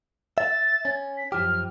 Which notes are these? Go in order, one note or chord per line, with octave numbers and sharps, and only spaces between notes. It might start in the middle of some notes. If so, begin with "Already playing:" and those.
E5 A6
C#4
B6
F#2 F3 G4 F6